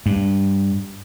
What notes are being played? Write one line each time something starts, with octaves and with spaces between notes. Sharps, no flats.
G2